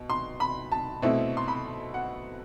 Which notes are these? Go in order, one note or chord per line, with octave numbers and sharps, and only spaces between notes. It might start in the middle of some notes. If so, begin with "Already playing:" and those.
Already playing: B2
C6
B5
A5
B2 A3 C4 E4
C6
B5
F#5